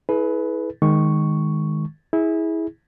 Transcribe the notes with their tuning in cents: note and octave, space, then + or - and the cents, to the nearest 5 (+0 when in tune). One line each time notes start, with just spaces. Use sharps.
E4 -25 G#4 +45 B4 +0
D#3 -5 G#3 +0 C#6 +0
E4 -20 G#4 +0